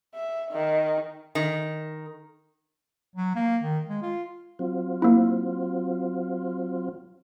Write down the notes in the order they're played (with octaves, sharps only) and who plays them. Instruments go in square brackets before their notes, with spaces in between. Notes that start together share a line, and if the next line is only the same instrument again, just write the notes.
[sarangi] E5
D#3
[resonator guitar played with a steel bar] D#3
[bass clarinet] F#3
A#3
D#3
G#3
F4
[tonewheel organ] F#3 C4 F4
[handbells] A#3 E4